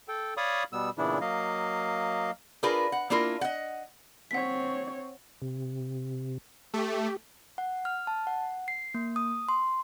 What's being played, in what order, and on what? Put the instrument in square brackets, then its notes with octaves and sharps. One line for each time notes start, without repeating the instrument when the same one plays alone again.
[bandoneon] A4 G5
C#5 D5 F5 B5 C#6 D#6
B2 G3 B3 E6
A#2 C#3 E3 B3 D4 E4
F#3 A#3 D#5 F5
[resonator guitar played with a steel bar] D4 F4 G#4 A#4 B4
F#5
A#3 D4 E4 F4 A#4
D#5 F#5
[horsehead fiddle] C4 C#5 [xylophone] F#5 B6
[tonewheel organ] C3
[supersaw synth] A3 [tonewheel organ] G4
[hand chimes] F#5
F6
A5
F#5
C7
A#3
D#6
C6